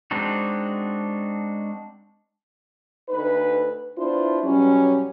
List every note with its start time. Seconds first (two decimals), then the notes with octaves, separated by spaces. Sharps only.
0.11 G#3 C4 D4 D#4 F#4
3.09 D2 D#4 B4
3.96 B3 D4 E4 F4 C5
4.43 B2 F#3 G3 C#4